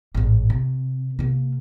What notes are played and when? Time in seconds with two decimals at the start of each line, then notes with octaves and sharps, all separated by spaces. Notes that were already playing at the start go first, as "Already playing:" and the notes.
0.14 A1 G#2
0.50 C3
1.19 C3 A#3